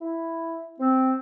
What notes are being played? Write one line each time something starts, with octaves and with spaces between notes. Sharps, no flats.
E4
C4